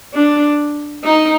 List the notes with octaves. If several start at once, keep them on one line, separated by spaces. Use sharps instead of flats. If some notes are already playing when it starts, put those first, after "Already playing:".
D4
D#4